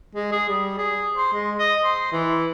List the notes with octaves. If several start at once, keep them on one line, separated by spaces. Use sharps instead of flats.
G#3
G#4
G3
G#4
C5
G#3
D#5
C5
E3